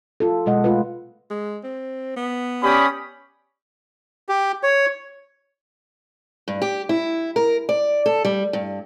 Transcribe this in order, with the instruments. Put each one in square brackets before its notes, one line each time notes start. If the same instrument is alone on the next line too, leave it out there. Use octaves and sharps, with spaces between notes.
[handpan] F4 A4
B2 G#3 D#5 F#5
A3 F4 B4
[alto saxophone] G#3
C4
B3
[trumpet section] C#4 D5 B5 [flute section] G4 D#6
[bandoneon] G4
C#5
[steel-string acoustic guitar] G2
G4
E4
A#4
D5
A4
G3
G2